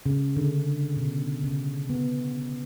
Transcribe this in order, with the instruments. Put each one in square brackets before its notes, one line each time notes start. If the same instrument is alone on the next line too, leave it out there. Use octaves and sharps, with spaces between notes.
[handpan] C#3
D3
B2
C#3
B3